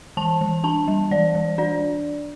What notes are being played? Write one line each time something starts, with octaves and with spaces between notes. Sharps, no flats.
E3 A5
E3
D4 A5
G3
E3 D5
E3
D4 D5